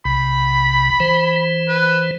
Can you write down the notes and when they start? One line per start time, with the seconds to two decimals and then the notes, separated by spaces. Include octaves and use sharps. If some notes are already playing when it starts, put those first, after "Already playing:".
0.05 B1 C3 B5
1.00 E3 C5
1.68 B4